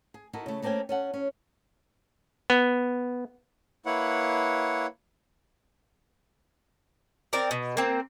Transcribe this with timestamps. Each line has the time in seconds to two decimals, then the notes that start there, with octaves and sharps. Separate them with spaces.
0.14 G#4
0.33 D#4 E4 F#4 A4 A#4
0.46 C#3 A3
0.62 A3 A#3 C4 C#4 G5 G#5
0.89 C#4 A4 F#5
1.14 C#4
2.50 B3
3.86 A#3 E4 B4 C#5 F#5
7.33 C4 A#4 D5
7.51 B2
7.77 A#3 C4